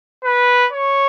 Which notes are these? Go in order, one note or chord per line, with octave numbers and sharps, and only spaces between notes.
B4
C#5